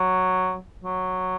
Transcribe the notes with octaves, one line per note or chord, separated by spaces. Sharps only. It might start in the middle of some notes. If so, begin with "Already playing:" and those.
Already playing: F#3
F#3